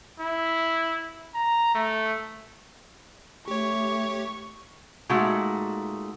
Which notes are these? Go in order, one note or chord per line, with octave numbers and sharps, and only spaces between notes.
E4
A#5
A3
A3 G4 C#5 C#6
A#2 G#3 A3 D#4 F#4